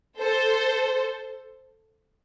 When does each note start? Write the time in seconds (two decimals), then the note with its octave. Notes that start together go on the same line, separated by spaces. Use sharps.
0.19 A4 C5